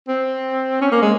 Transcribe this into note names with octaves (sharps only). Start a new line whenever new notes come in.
C4
C#4
A#3
G#3